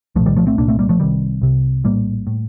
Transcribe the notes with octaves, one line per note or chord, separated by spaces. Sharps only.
C2 A#2 F3 A3
D#3 G3
F3 A3
A3 C4
C2 A#2 A#3 D4
A3 C4
G3 A#3
F3 A3
C2 C3 D#3 G3
C2 C3
A#1 A2 G3 A#3
A2